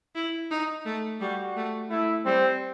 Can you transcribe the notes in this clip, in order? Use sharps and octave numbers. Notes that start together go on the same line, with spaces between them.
E4
D#4
A3
G3 F#4
A3
A3 E4
G3 C4